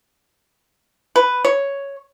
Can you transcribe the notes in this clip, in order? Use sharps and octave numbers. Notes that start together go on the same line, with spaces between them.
B4
C#5